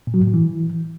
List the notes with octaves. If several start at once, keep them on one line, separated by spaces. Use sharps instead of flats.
A#2
F#3
G#2
A2
E3